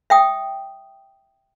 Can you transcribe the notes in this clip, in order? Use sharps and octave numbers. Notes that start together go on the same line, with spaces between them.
E5 G5 D#6